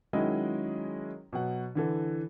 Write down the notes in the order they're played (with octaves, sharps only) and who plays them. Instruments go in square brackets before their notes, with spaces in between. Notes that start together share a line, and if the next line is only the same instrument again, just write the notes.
[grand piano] D#3 F#3 G#3 C#4 E4 D#5
B2 F#3 F#5
D3 E3 A4